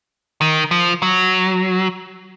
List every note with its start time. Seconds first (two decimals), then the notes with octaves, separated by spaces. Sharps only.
0.41 D#3
0.71 F3
1.02 F#3